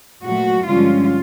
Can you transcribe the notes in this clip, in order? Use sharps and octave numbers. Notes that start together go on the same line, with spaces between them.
A#2 F#3 A3 F#4
G2 D3 F3 G#3 C#4 F4